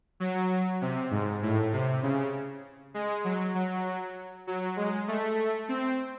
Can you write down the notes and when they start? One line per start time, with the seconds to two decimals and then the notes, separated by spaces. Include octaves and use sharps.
0.20 F#3
0.82 C3
1.11 G#2
1.42 A2
1.73 C3
2.03 C#3
2.94 G#3
3.24 F#3
3.55 F#3
4.47 F#3
4.77 G#3
5.08 A3
5.69 C4